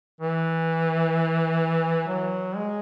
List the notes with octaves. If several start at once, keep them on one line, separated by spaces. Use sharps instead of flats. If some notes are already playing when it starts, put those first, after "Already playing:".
E3
F#3
G#3